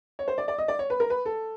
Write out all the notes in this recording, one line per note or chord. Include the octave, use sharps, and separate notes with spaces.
C#5
C5
D5
D5
D#5
D5
C#5
B4
A#4
B4
A4